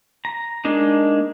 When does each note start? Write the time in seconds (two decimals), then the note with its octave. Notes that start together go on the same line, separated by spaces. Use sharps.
0.25 A#5
0.65 G#3 A#3 D4 D#4